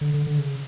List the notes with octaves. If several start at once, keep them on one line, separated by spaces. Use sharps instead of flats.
D3
D3
D3
C#3